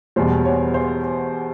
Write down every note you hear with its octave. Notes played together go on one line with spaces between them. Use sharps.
E2 B2 G3 C5
C#5
C5